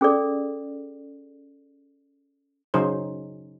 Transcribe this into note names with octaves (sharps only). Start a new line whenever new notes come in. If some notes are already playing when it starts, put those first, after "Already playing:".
C#4 G#4 A4 D5
C#3 F#3 D#4 G#4 C5